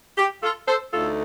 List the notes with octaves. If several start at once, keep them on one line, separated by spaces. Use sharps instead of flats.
G4
F4 A4
A4 C5
D2 D3 A3 D#4 F4 A4